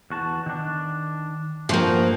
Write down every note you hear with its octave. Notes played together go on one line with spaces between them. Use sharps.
E2 F#4 A5
D#3 D4
G2 F3 A#3 F#4 G5